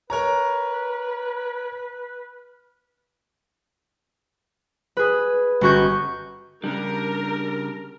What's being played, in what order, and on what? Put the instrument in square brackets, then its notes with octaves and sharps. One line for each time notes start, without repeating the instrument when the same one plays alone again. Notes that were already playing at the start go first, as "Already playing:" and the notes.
[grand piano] A#4 C#5 A#5 [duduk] B4
[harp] G#4 B4
G1 C#4 F#4 C#6 G6
[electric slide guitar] C#3 G3 [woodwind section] D4 [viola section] A#4